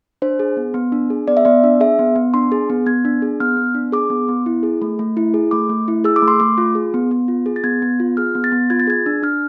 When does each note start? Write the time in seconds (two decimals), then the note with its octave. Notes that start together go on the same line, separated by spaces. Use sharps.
0.22 D4 C5
0.39 G#4
0.57 B3
0.74 B3
0.92 D4
1.10 G#4
1.28 B3 D5
1.37 E5
1.45 B3 D5
1.64 D4
1.80 G#4 E5
1.99 B3
2.16 B3
2.34 D4 C6
2.52 G#4
2.70 B3
2.86 B3 G#6
3.05 D4
3.22 G#4
3.40 B3 F6
3.57 B3
3.75 D4
3.92 G#4 D6
4.10 B3
4.28 B3
4.46 E4
4.63 G#4
4.82 A3
4.99 A3
5.17 E4
5.34 G#4
5.51 A3 D6
5.69 A3
5.88 E4
6.04 G#4 E6
6.16 D6
6.22 A3
6.28 C6
6.40 A3 D6
6.58 F4
6.75 G#4
6.94 B3
7.11 B3
7.28 F4
7.46 G#4
7.56 A6
7.64 B3 G#6
7.82 B3
8.00 F4
8.17 G#4 F6
8.35 B3
8.44 A6
8.52 B3
8.70 F4 G#6
8.80 A6
8.87 G#4 G#6
9.06 D4
9.23 D4 F6